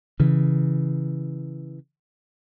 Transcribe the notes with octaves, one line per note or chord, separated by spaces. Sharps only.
C#3 E3